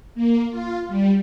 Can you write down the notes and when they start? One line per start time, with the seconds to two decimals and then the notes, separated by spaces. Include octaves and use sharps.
0.15 A#3
0.51 F4
0.88 G3